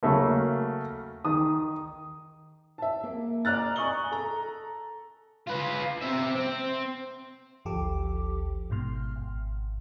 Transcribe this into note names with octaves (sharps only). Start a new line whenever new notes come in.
C#3 F#3 A3 A#3
D#3 D#6
E5 A5
A#3
D5 D#5 A#5 F6 F#6 A6
G#5 A#5 C#6 D#6 F#7 G7
A4 A#5
F4 B4
C4 E5
C4
G#1 D2 F3 G4 A4 D6
G#1 G#2 B2 C6 F6
G#1